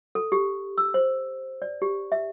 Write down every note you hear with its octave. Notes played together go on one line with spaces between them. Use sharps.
A4
G4
E6
C5
D5
G4
E5